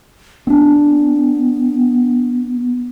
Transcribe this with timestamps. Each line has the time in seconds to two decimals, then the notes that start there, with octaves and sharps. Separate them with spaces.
0.47 B3 C4 D4